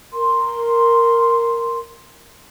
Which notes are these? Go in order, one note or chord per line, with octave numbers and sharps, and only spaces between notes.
A#4 C6